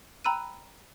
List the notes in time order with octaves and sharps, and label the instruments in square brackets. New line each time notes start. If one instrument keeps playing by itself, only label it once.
[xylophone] G5 A#5 B5 E6 F#6 D#7